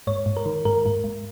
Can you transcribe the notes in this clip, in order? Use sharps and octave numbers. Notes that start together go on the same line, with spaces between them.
G#2 C#5
G#2
A#4
D#3
G#2 A#4
G#2
G#2